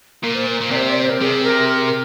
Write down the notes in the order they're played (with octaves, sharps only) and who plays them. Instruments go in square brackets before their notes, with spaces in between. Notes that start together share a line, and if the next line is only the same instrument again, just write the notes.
[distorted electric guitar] A#2 [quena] A#4
[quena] C5
A#4
[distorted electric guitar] A#2
[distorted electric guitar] C3 [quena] C5 D5
[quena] D5
C5
A#4
[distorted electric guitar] C3 [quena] G#4
[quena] A#4
A#4